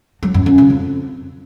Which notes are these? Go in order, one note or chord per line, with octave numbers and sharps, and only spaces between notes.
F#3
F#2
F#2
C#3
F2